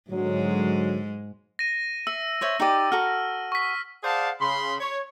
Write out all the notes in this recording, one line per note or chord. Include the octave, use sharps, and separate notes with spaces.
G#2 D3 F#3 G#3
A#6 D#7
E5 E6
C5 C#5 E5
D#4 G4 D5
F#4 A4 A#5 F6
C#6 B6
G#4 C5 D5 F5 F#5 A5
C#3 B5 C6
C#5